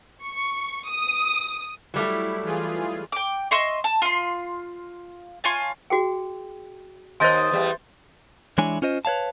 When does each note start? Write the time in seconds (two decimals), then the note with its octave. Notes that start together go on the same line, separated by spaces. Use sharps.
0.24 C#6
0.89 D#6
1.94 F#3 G3 A3 E4
2.43 E3 F4 G#4
3.12 G5 D6
3.51 D#5 E5 C6 C#6
3.84 A5
4.02 F4 C6
5.44 F4 C#5 G#5 A5
5.90 F#4 G#4 G5
7.20 D#2 D#4 C5 D#5 G#5 C6 G6 A6
7.51 E2 G3
8.58 E3 G#3 D4 E4 C#5 G#5
8.82 C#4 F4 C5 D#5
9.05 B4 C#5 F5 A5